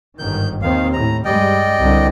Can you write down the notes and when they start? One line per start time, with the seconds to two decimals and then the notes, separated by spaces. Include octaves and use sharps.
0.19 G1 G#2 D#3 G6
0.62 D#2 D#3 C4 F5
0.93 A2 A#5
1.25 G2 G3 G#3 D5 D#5 G5
1.79 C2 D3